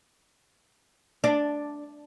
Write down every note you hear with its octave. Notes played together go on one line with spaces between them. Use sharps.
D4